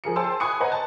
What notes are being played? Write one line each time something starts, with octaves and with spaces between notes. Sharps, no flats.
F3 G#4 A#4 C#7
G#4 C5 G5 A5 C6 E6
G#5 B5 C#6 D#6 F#6 C#7
B4 C5 D#5 F#5 G#5 A#5
A5